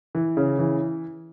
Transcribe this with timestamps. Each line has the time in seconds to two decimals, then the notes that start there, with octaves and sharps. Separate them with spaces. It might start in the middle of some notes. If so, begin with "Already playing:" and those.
0.15 E3
0.37 C#3
0.59 E3